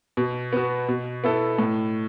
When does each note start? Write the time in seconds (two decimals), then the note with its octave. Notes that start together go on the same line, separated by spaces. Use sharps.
0.17 B2
0.53 B3 F#4
0.88 B2
1.24 B3 E4 A4
1.59 A2